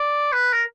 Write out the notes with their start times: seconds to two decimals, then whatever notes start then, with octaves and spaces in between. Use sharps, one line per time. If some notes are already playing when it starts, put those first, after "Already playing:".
Already playing: D5
0.32 B4
0.53 A#4